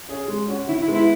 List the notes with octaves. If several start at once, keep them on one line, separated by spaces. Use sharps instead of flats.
C#4 G#4
G#3
C#4 F#4
D#3 E4
E4
G#3 B3
E4